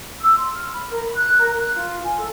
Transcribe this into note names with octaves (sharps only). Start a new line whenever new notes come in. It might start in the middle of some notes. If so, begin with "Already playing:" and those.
E6
C6
F6
B5
A#4
B5
F#6
A#4
F#6
F4
G#5
A4